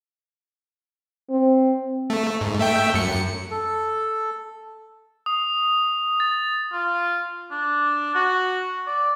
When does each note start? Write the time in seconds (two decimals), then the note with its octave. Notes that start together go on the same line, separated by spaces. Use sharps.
1.30 C4
2.10 A3
2.41 G#2
2.59 A3 E5 G5
2.94 F#2 C#7
3.51 A4
5.26 D#6
6.20 A6
6.72 F4
7.51 D4
8.15 F#4
8.87 D5